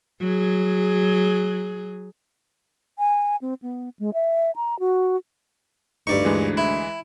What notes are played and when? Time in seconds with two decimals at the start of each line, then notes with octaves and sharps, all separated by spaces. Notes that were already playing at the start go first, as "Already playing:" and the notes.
0.21 F#3 G#4
2.99 G#5
3.42 C4
3.62 B3
3.99 G#3
4.14 E5
4.56 A#5
4.79 F#4
6.07 D2 G2 D#4 D5 C#6
6.25 D2 E3 G#3 D#4
6.57 E4